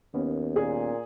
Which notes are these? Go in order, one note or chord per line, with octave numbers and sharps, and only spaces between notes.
D#2 A#3 B3 C#4
A#2 G#4